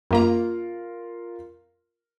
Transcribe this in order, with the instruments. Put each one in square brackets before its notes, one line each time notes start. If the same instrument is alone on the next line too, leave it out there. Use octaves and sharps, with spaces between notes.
[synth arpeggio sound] F#2 A#3 A#5 [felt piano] F4 A#4